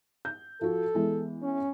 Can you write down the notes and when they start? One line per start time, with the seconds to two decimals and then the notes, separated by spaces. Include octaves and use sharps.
0.25 G6
0.61 F3 F#4 A4
0.95 E3 G#3 B3
1.43 C#4